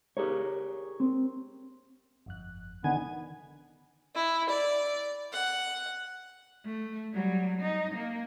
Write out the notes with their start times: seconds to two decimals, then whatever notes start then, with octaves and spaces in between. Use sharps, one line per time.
0.17 G4 G#4 A#4 C#5
1.00 C4
2.26 G1 F2 F#6
2.84 D3 D#3 B3 G#5
4.15 E4
4.49 D5
5.33 F#5
6.66 A3
7.13 F#3 G3
7.62 D#4
7.95 A#3